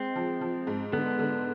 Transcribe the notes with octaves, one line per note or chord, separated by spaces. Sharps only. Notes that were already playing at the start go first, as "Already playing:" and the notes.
Already playing: G#3 C4
F3
F3
G#2
D3 B3
D3